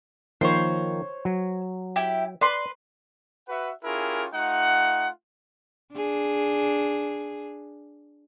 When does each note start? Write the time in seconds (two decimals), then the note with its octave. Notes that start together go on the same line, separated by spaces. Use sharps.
0.41 D#3 F3 A#3 C5 C#5
1.25 F#3
1.96 E4 G4
2.41 B4 D5 C6
3.49 F#4 B4 E5 F#5
3.84 C#4 E4 F4 G4 G#4 A#4
4.34 A3 D#4 F4 F#5
5.94 D4 G#4